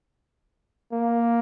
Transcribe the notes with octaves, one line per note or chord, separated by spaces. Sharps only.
A#3